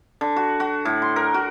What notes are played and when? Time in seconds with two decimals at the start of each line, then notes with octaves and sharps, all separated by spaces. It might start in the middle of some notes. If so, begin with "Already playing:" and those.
0.21 D3
0.36 F#4
0.60 F#4
0.85 A2
1.02 C6
1.16 A#4
1.34 F#4